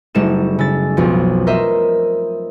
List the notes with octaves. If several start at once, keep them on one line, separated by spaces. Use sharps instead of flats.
F#1 G3 A3 D#4 E7
C#3 E6 A6
B1 F2 F3
A#4 C5 D#5 E5